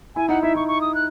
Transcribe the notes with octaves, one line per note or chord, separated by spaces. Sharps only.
E4 G#5
D#4 F#5
E4 E5
E4 C#6
C#6
D#6
F#6